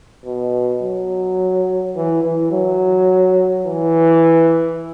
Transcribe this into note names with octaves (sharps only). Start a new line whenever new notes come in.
B2
F#3
E3
E3
F#3
E3